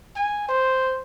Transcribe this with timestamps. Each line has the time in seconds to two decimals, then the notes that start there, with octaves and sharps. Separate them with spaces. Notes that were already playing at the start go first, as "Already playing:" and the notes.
0.16 G#5
0.49 C5